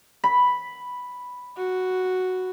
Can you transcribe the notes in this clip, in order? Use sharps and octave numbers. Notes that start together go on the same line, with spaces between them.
B5
F#4